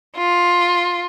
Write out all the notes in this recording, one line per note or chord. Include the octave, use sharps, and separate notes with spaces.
F4